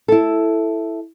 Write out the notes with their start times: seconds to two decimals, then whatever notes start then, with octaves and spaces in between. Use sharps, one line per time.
0.08 E4 A4